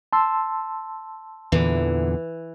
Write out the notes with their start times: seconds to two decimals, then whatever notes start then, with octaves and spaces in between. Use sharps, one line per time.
0.13 A5 C6 E6
1.52 E2 A#2 D3 E3